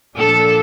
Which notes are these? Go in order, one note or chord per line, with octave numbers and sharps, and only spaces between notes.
A#2 F3 A#3 D4 A4